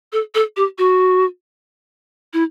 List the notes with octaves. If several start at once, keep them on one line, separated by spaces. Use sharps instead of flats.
A4
A4
G4
F#4
E4